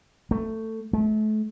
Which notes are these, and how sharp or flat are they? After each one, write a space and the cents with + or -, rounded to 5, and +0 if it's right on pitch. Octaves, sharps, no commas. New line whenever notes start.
A3 +15
A3 -35